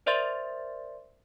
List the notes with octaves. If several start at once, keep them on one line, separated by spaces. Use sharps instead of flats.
A#4 C5 D5 E5 C6 A6